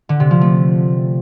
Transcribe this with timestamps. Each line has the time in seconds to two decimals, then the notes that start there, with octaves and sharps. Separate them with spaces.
0.09 D3
0.20 C3
0.31 F3
0.41 A3